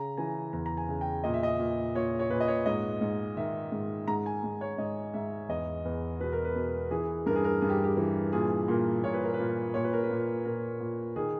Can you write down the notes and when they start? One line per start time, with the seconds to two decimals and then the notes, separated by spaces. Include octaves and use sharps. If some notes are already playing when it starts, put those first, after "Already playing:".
Already playing: C#3 A#5
0.17 E3 G#5
0.53 E2 A#5
0.66 A#5
0.77 G#5
0.89 C#3
1.01 G5
1.24 A#2 D#5
1.34 E5
1.43 D#5
1.59 A#2
1.95 A#2 C#5
2.19 C#5
2.30 A#2 B4
2.40 D#5
2.48 C#5
2.66 G#2 D#5
3.01 G#2
3.37 D#3 E5
3.72 G#2
4.07 G#2 A#5
4.26 G#5
4.44 G#2
4.61 C#5
4.78 G#2 D#5
5.14 G#2 E5
5.49 E2 D#5
5.85 E2
6.20 B2 B4
6.33 A#4
6.44 B4
6.55 B2
6.91 E3 G#4
7.26 G2 A#4
7.36 G#4
7.44 A#4
7.61 G2 G#4
7.69 G4
7.84 G4
7.97 E3
8.33 A#2 G#4
8.68 A#2 A#4
9.03 A#2 C#5
9.14 B4
9.24 A#4
9.34 B4
9.39 A#2
9.74 A#2 C#5
9.84 B4
9.93 A#4
10.03 B4
10.10 A#2
10.45 A#2 A#4
10.80 A#2
11.16 D#3 G#4